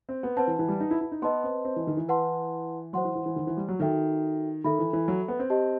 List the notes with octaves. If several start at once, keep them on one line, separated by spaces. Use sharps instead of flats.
C4
B3
C4 B4 F#5 A5
E3
E3
G3
D#4
E4
E4
D#4
B3 B4 D#5 A5 C6
C4
C4
E3
D#3
E3
E4 B4 F#5 A5 C6
F#3 C5 F#5 C6
E3
E3
E3
D#3
E3
G3
F#3
D#3 D#4 F#4 A4 E5 G5
D#3 A4 E5 B5
E3
E3
F#3
B3
C4
G4 D#5 A5